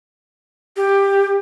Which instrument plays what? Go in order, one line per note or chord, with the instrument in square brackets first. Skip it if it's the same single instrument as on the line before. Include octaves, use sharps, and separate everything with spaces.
[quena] G4